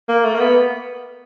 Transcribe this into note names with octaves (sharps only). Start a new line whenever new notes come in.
A#3
A3
A#3
B3